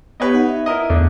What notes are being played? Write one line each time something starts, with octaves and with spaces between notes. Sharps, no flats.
B3 G4 B4 C#5 D#5
D#4 F#5
E5
E4 A#4 D#5
E2 D3 A3